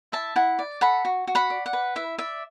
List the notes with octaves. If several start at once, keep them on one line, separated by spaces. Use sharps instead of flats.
E4 E5 A5
E4 F#5
D5
A4 F#5 B5
F#4
F#4
F#5 B5
D5
F#5
B4
E4 E5
D5 E5